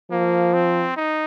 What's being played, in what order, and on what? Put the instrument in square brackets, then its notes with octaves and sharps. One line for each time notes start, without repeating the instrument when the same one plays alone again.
[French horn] F3 [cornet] A#3
[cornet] C4
D#4